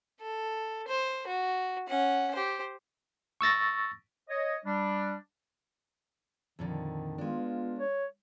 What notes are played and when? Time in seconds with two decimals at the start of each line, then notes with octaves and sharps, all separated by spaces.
0.21 A4
0.87 C5
1.27 F#4
1.89 C#4 F#5
2.35 G4 C5
3.41 C#6 E6 A6 A#6
4.29 C#5 D#5
4.65 G3 D4
6.59 F2 A#2 D3 D#3
7.18 G#3 B3 D4 F4
7.79 C#5